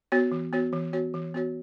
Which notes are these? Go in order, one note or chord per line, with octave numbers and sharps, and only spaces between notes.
B3 F#4 C#5
E3
B3 F#4 C#5
E3
B3 F#4 C#5
E3
B3 F#4 C#5